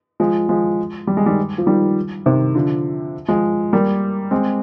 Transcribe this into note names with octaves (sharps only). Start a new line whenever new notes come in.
F3 G#3
F3 G#3
G3
G#3
D#3 G3
F3
D#3 G3
C3 D#3
D3 F3
F3 G#3
G3 A#3
G#3 C4